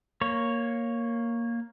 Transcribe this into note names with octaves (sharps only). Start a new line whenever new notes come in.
A#3 C#5